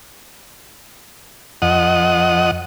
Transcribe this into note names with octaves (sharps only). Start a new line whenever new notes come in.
F2 D#5 F#5